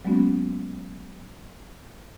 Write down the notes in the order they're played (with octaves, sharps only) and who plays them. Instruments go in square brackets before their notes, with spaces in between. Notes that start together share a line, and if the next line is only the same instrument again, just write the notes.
[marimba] F#3 G#3 A#3 B3 C#4 F#4